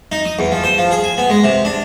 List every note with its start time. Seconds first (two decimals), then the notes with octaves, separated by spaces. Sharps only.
0.12 D#4
0.26 D#6
0.39 E2
0.52 F3
0.64 C5
0.78 F3
0.91 G#4
1.04 G#5
1.18 B3
1.30 G#3
1.44 C3
1.65 D4